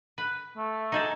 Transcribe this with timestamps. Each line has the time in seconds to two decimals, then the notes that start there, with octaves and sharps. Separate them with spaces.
0.18 B4
0.57 A3
0.92 D#4 G#4 A4